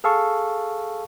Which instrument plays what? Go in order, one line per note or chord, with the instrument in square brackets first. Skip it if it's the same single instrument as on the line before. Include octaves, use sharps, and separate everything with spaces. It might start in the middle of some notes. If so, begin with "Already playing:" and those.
[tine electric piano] G#4 A4 F5 A5 C#6